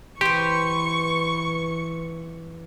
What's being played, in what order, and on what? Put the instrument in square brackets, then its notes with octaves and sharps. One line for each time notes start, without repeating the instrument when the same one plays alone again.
[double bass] E3 [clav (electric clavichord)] G4 [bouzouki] B4 C5 [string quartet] C#6